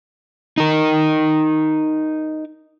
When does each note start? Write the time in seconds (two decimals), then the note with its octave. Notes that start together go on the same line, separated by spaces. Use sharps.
0.58 D#4 A#4